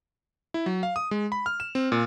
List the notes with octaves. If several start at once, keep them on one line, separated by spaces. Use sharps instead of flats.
E4
F#3
F5
D#6
G#3
B5
F6
E7
C4
A#2